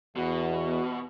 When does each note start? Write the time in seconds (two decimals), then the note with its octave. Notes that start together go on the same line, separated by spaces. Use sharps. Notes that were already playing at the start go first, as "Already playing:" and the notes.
0.17 E2 B2 F#4